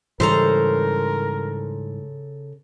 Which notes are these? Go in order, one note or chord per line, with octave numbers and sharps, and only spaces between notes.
G#2 C#3 E3 G3 A4 A#4 C5 A#5